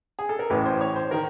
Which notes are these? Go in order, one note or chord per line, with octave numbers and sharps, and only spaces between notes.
G#4
A4
A#4
A1 A2 E3 B4
C5
C#5
C5
D#3 A#4